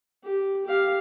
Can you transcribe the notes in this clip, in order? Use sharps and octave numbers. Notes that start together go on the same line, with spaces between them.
G4
G4 F5